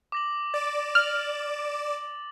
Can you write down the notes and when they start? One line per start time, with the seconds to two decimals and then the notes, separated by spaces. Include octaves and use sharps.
0.12 D6 A#6 F#7
0.54 D5 D6 A6 E7
0.95 F6 F#7